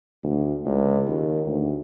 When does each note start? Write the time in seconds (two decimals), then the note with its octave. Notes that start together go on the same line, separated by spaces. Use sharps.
0.23 D2
0.65 C#2
1.07 D#2
1.46 D2